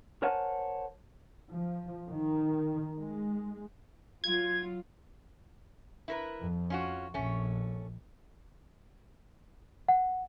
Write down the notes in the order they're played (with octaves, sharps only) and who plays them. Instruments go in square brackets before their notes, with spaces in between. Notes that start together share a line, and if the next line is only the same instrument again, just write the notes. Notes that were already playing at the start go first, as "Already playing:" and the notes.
[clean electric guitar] A#4 C5 C#5 F#5 G#5 A5
[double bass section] F3
D#3
G#3
[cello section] F#3 F4 [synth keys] G#6
[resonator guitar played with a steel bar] E4 A#4 B4
[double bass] F2 F3
[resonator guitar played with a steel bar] C#4 F4 F#4
[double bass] A#1 [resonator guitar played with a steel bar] A3 C#4
[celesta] F#5